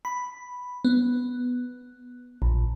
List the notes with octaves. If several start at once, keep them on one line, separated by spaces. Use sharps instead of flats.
B5
B3
A#1